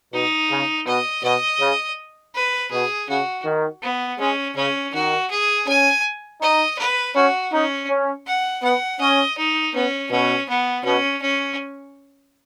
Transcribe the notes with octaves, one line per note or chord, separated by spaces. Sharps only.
B2 D#4
C#3
B2 D#5
B2 D#5
C#3
B4
B2 G#4
C#3 F#4
D#3
B3
G#3 C#4
C#3 C#4
D#3 F#4
G#4
C#4 G#5
D#4 D#5
B4
C#4 F#4
C#4 D#4
C#4
F#5
B3 F#5
C#4 D#5
D#4
B3 C#4
B2 C#4
B3
B2 C#4
C#4